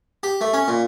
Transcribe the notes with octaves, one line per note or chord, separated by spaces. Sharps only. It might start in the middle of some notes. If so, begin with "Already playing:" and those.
G4
A3
C#4
A#2